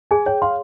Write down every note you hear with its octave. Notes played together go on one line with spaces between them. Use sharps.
G#4 G#5
C#5 G5
F5 C6